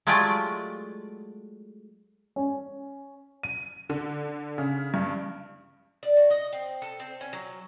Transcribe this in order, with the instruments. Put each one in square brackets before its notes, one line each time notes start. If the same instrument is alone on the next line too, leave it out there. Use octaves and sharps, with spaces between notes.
[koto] F#3 G#3 A3 F4 G4 D5
[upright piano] C#4
[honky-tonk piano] D#7
D3
C#3
G2
[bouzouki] D5
F#4
D#5
C4
A4
C4
C#4
F#3